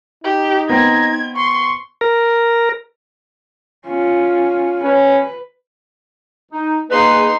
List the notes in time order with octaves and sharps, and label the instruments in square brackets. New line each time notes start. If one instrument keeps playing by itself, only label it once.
[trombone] D#4 [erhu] G4
[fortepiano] B3 C4 [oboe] A#5 [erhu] G#6
[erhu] C6 [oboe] C#6
[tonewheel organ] A#4
[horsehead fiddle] C#4 F4
[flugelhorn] C#4 [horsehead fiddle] B4
[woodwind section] D#4
[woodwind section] A#3 G#4 B4 [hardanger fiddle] D#4 C6